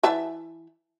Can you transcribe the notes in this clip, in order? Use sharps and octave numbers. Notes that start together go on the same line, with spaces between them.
E3 E5 A5